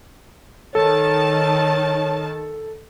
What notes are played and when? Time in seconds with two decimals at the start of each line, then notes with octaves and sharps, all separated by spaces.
0.75 D#3 A4 C#5 A5